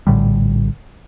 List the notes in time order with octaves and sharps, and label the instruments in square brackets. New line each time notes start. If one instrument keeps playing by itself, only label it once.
[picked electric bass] A#1 A2 D3 G3